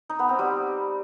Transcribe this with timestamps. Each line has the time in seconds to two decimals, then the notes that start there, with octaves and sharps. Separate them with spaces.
0.09 D#4
0.19 B3
0.29 C4
0.39 G3